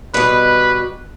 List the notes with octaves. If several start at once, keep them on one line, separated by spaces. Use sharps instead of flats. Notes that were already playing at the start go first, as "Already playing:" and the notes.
B2 G3 B4